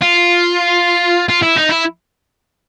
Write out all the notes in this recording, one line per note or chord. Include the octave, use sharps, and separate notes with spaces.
F4
F4
E4
D#4
E4